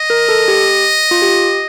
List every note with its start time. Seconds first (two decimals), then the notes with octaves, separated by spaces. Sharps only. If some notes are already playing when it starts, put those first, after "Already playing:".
Already playing: D#5
0.10 A#4
0.29 A4
0.48 G4
1.11 F4
1.22 G4